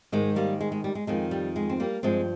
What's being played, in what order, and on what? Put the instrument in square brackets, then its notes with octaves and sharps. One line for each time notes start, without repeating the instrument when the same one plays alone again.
[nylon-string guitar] G#2 D#3 G#3
G3 A#3
G#3
G#3
G3
G#3
F2 D#3 G#3
G3
G#3
C4
G3 A#3
G2 F3 G#3 C4